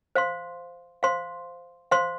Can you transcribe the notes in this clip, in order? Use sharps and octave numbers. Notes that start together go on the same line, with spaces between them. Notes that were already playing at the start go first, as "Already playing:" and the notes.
C5 F5 C6
C5 F5 C6
C5 F5 C6